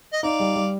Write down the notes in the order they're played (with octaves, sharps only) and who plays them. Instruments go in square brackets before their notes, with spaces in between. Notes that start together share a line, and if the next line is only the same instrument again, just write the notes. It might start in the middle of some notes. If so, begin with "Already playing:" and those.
[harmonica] D#5
[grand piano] D#4 [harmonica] D5 F5
[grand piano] G3
G3